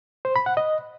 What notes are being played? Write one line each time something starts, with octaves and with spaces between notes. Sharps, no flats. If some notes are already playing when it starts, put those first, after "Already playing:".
C5
B5
F#5
D#5